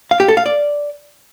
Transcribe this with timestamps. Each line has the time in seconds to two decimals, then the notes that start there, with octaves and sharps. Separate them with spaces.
0.11 F5
0.20 G4
0.28 A4
0.37 F5
0.46 D5